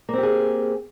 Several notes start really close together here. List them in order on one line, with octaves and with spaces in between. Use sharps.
A#3 C4 G4 G#4